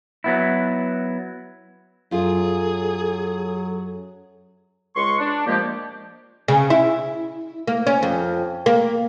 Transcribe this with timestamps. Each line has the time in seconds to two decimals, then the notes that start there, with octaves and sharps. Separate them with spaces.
0.24 F#3 B3 E4
2.11 F#2 F#3 F4 G#4 A4
4.96 C#2 G#3 C6 C#6
5.19 D4
5.46 A#2 F3 G#3 A#3 G4
6.48 C#3
6.70 E4
7.67 A#3
7.87 C#4
8.03 F2
8.66 A#3